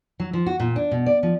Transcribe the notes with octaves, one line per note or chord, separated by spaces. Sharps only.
F#3
F3
F#4
A#2
D4
B2
D5
F3